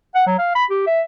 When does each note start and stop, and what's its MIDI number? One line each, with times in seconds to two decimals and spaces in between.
0.15 0.23 78
0.27 0.37 54
0.39 0.54 77
0.55 0.65 83
0.70 0.85 67
0.87 1.01 76